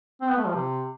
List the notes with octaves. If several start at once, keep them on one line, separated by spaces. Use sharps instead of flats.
C4
B3
A3
F3
C3